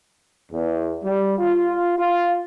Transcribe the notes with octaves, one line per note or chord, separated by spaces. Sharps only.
E2
G3
F4
F4